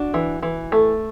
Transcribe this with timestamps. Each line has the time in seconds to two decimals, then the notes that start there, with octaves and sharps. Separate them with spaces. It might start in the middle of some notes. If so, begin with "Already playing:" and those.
Already playing: D4 F#4
0.14 E3
0.42 E3
0.72 A3